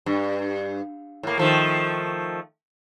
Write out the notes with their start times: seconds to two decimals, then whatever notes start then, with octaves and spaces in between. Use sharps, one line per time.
0.06 G2
1.23 A2 A#3
1.38 D#3 F3 A3